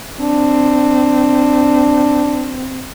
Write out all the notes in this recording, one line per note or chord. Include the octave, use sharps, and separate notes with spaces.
C4 D4